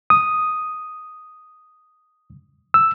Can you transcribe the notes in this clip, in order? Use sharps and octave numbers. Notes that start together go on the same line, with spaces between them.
D#6
E6